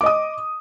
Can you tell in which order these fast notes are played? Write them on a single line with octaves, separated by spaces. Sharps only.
D6 D#5 D#6